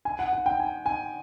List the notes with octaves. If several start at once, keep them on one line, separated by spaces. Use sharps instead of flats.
G#5
F#5
F#5
G5
G#5
G#5